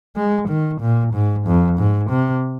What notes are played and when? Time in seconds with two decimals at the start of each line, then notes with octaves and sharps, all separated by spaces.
0.16 G#3
0.49 D#3
0.81 A#2
1.13 G#2
1.46 F2
1.78 G#2
2.10 C3